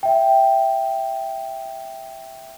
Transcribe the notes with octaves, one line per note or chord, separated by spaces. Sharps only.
E5 G5